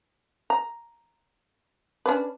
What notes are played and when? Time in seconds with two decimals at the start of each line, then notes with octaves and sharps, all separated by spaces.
0.50 A#5
2.06 C#4 D4 B4